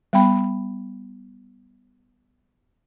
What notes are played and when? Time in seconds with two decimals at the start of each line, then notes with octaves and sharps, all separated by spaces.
0.13 G3 B3 G5 B5